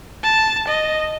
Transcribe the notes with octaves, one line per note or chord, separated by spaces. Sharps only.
A5
D#5